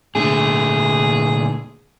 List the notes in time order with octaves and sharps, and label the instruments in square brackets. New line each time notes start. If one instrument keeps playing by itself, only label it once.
[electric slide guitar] A#2 D3 A3 [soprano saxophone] G#4